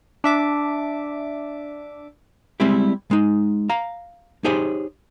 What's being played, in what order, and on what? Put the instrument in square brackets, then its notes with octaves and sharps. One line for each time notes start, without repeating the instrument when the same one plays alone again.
[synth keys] D4 E5 D6
[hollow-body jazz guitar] G3 G#3 C4 E4 G4
G#3 D#4
F5 A#5
D#4 G4 G#4 C5 C#5